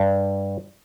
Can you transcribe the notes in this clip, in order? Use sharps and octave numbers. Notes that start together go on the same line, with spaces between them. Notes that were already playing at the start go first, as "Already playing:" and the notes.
Already playing: G2